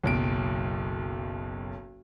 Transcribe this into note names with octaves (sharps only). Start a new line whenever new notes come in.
F#1 B1 D7